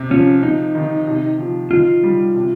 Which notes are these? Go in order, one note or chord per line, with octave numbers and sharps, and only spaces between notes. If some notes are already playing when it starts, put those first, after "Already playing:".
Already playing: C3
F3 C#4
C3 D#4
D#3
C3
F3
D#3 F4
G3
C3